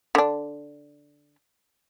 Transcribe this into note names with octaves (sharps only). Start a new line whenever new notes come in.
D3 D4